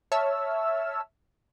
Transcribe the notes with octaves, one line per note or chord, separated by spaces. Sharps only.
C#5 E5 A5 E6 F6